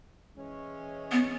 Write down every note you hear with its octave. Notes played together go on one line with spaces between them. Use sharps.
E3 G#3 C#4
B3